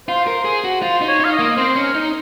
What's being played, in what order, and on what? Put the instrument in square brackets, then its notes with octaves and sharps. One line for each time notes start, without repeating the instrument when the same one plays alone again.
[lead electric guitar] F4 [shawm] C5
[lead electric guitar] A#4
G#4
F#4
[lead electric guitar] F4 [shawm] C5
[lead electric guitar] D#4
[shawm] C#5
[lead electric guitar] D#4 [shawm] F5
[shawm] D#5
[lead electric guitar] A#3
[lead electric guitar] C4 [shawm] C5
[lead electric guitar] C#4
[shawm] A#4
[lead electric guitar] D#4